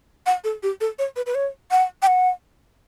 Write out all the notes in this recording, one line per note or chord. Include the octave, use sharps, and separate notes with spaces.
F#5
A4
G4
A4
C#5
B4
B4
C#5
F#5
G5
F#5